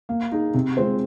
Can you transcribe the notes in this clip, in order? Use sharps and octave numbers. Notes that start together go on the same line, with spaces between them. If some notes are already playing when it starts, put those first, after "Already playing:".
A#3
D#4 G#4
C3
G#3 C4 F4 C5